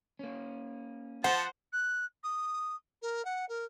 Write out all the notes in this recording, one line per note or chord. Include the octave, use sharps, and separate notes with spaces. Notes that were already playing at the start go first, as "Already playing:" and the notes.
A#3 C#4
F3 C5 F#5 A5
F#6
D#6
A#4
F#5
A#4